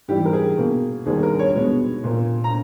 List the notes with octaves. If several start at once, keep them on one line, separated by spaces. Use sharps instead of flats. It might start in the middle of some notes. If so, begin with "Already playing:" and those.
G#2 E3 G3 G4
A#4
G#4
B2 A#3
D#2 D#3 G3 A#3 G#4
A#4
C#5
B2 G#3 B3
A#2 A#3
A#5